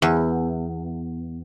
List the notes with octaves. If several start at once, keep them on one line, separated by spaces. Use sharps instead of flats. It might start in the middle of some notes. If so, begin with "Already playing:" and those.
E2